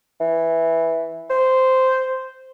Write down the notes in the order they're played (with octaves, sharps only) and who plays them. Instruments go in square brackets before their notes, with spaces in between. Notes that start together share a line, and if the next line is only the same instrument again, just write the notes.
[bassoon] E3
C5